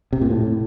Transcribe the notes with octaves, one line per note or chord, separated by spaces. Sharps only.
C3
A#2
A2